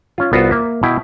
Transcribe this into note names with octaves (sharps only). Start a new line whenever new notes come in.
C#4 F4
C2 B3 F4 F#4 E5
A#3 E5
B2 E4 G5